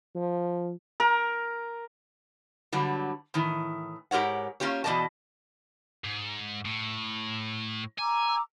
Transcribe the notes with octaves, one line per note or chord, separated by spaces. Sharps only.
F3
A#4
G2 D3 F#3 G3
A2 D#3 E3
G#2 G4 A#4 C#5 F#5
A#3 C#4 F4 G4 C#5
E2 B2 F3 D5 D#5 A5
G#2
A2
G#5 A#5 D6 E6